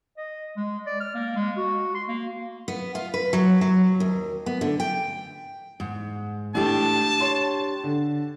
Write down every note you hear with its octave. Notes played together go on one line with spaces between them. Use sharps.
D#5
G#3
D5
F6
A#3
G#3
F#4
C6
A#3
B3
F4
B4
F#3
F#3
D#2
B3
D3
G5
G#2
A2 D4 G4 A5
C#5 C6
D3